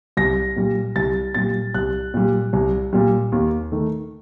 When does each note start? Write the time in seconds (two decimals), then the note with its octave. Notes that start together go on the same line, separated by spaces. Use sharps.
0.17 C2 A#6
0.56 A#2 G3
0.96 C2 A6
1.34 A#2 G3 A6
1.74 C2 F#6
2.14 A#2 G3
2.53 C2
2.93 A#2 G3
3.32 D#2
3.72 D#3 A3